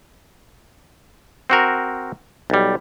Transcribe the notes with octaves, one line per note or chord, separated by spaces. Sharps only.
C4 F#4 A#4
B1 G3